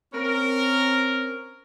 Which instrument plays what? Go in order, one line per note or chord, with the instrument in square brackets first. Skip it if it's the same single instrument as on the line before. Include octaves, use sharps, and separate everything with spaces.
[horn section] C4 C#4 A#4